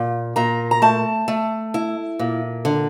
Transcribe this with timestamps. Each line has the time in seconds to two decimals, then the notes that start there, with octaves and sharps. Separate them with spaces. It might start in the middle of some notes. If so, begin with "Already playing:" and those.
Already playing: A#2
0.36 A#2 A#5
0.71 A#5
0.82 A3 A5
1.28 A3
1.74 E4
2.19 A#2
2.65 D3